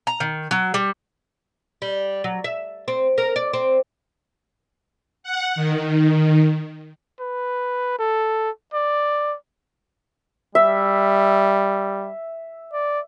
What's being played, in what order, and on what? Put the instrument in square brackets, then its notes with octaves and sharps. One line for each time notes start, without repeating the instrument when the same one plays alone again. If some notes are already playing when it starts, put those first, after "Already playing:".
[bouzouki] A#5
D#3
F#3
G3
[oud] G3
F#3
E5
C4
A#4
D5
C4
[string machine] F#5
D#3
[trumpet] B4
A4
D5
[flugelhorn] G3 [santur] E5
[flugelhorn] D5